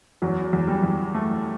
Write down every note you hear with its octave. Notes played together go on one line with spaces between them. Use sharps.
E2 F#3
E2
G3
E2
A3